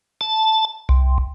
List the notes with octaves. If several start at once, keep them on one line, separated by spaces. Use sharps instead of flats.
A5
C2